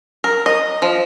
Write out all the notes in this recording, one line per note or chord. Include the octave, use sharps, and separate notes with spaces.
A#4
D#5
F3